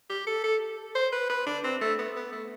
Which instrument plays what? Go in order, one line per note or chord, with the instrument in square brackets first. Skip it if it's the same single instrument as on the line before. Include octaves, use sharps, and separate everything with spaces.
[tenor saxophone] G4
A4
A4
C5
B4
B4
D4
C4
A3
B3
B3
A3